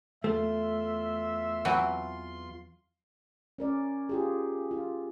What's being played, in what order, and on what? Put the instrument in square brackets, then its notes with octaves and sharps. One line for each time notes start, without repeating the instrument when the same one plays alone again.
[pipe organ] E2 F4 C6 [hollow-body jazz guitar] A3 [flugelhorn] E5
[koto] E3 F#3 C4
[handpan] C#4 A#4 D5
F4 G4 G#4
F4